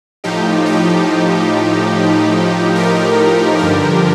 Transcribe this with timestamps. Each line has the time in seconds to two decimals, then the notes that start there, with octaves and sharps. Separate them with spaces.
0.24 A2 F3 D#4 G4
0.66 D#4 G4
2.76 G4 A#4
3.59 G2 D3 F3 G4 A#4